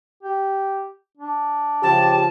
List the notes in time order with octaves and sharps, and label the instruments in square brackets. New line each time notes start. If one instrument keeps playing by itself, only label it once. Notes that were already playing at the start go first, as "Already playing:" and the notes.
[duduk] G4
D4
[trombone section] C#3 F3 [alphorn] G4 [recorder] A5